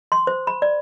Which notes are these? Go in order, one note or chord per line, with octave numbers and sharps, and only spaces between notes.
C6
C5
B5
D5